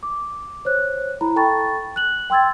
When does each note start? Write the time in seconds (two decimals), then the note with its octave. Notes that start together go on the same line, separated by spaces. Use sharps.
0.03 D6
0.65 C5 C#5 F#6
1.21 E4 A#5 B5
1.36 A4 G5 A5 B5 C#6 A6
1.96 F#6 F#7
2.30 G5 C6 E6 G#6 A6